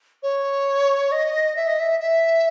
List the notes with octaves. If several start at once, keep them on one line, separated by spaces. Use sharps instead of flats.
C#5
D#5
E5
D#5
E5
E5